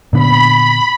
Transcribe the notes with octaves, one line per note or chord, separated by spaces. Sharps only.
A#2 D3 B3 B5